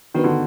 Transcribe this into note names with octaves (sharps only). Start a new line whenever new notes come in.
D#3 B3 D4 F#4 B4
D3